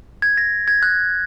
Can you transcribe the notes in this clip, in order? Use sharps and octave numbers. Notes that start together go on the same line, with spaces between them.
G#6
A#6
G#6
F#6